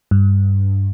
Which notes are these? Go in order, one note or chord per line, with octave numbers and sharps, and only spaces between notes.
G2